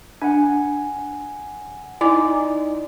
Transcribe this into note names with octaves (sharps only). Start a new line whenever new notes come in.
D4 F#5 G#5
D#4 E4 D5 G#5 D6